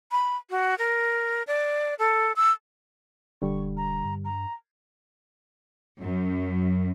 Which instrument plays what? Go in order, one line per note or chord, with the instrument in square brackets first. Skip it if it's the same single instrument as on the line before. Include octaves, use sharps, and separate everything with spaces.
[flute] B5
F#4
A#4
D5
A4
E6
[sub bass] E1 [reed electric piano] D3 G3 [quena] C#6
[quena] A#5
[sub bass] G2
[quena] A#5
[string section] F#2